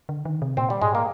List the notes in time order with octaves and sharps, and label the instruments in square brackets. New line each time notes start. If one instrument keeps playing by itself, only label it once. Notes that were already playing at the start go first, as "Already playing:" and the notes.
[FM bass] D3
D#3
C3
[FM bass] A#2 [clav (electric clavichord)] C4
[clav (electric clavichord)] G3
[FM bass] G#2 [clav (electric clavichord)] G#3
[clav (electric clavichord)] A#3